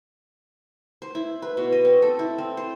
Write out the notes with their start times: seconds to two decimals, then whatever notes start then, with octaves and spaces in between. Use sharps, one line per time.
1.02 C5
1.15 E4
1.42 B4
1.57 B2
1.72 D#5
1.85 C4
2.02 A4
2.19 E4
2.38 C4
2.57 C5